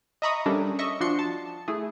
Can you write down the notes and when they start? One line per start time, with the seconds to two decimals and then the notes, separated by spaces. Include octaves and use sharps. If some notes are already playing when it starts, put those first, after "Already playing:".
0.22 D#5 E5 A#5 B5 C#6 D#6
0.46 G3 C#4 D4 G4 A4 A#4
0.79 D#5 E5 C#6
1.00 F3 D4 F#4 C6 C#7
1.19 A5
1.68 A3 E4 G#4